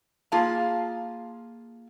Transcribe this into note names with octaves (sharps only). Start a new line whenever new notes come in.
A#3 F4 G#4 F5 A5